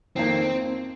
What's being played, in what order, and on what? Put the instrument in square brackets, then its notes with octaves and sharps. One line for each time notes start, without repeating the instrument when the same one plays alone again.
[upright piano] F2 D#3 A#3 D#4 [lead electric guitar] C4